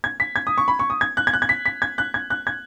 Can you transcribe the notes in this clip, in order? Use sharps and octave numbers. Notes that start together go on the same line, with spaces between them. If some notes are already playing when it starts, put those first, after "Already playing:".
G#6
B6
G#6
D#6
C#6
B5
C#6
D#6
G#6
F#6
G#6
F#6
G#6
B6
B6
G#6
F#6
G#6
F#6
G#6